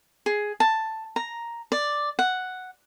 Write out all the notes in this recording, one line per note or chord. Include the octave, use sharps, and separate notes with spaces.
G#4
A5
A#5
D5
F#5